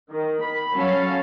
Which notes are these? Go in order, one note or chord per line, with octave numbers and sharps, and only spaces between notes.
D#3
B5
F#3 C#4 A4 F5